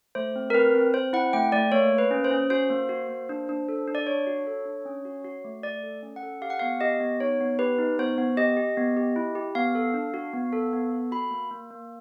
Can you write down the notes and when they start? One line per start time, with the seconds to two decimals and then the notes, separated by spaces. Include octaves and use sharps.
0.15 A3 C5
0.36 C4
0.50 A#4
0.54 C4 B4
0.75 C4
0.94 C4 C5
1.13 E4 F#5
1.33 A3 G5
1.52 A3 D5
1.72 A#3 C#5
1.91 A#3
1.98 B4
2.11 C#4
2.24 C5
2.31 C#4
2.50 F#4 C5
2.70 A#3
2.89 F#4
3.09 A#3
3.29 D4
3.49 D4
3.69 A4
3.88 D4
3.95 D5
4.07 D4 C#5
4.27 F#4
4.47 A4
4.65 D4
4.85 C#4
5.05 F#4
5.25 F#4
5.44 A3
5.63 A3 D5
5.83 A4
6.03 C#4
6.16 F#5
6.23 A4
6.42 G4 F5
6.50 F#5
6.60 B3 F5
6.81 G4 D#5
7.00 B3
7.20 D#4 C#5
7.40 B3
7.59 G4 B4
7.79 D#4
7.99 B3 C5
8.18 B3
8.37 G4 D#5
8.57 G4
8.77 B3
8.97 G4
9.16 E4
9.35 G4
9.55 B3 F5
9.75 A4
9.94 D4
10.14 F#4
10.34 B3
10.53 A4
10.73 B3
10.92 A4
11.12 F#4 B5
11.31 A#3
11.51 A#3
11.70 A#3